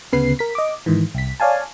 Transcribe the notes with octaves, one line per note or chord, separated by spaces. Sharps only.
D2 C#3 B3 B4 C7
A#4 B6
D#5 D6
G#2 D#3 E3
C2 B6
C#5 D5 F5 G#5 A5